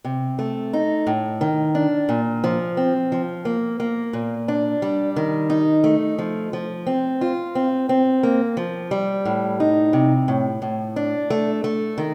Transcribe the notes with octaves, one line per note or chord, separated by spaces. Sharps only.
C3
A3
D#4
A2
D#3
D4
A#2
F3
C4
F3
A#3
A#3
A#2
D4
G3
D#3
D#4
A3
F3
F3
C4
F4
C4
C4
A#3
F3
G3
A2
D#4
C3
A2
A2
D4
A3
A3
D#3